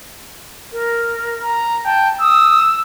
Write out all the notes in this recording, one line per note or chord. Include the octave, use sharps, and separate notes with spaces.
A#4
A#5
G5 A5
D#6 E6